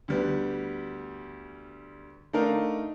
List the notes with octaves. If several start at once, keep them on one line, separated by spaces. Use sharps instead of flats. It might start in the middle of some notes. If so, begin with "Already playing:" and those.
D2 G3 B3
A3 D4 D#4 A#4 F5